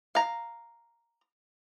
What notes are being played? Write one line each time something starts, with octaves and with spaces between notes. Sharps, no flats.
F5 A#5